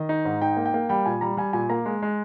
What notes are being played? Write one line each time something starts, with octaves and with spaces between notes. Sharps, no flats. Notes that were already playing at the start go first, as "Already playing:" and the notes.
Already playing: D#3 D#5
D#4
G#2
D#4 G5
A#3
G5
A#3
G3 G5
A#2 G#5
G3 A#5
G3 G#5
A#2 G#5
A#3 A#5
G#3
G#3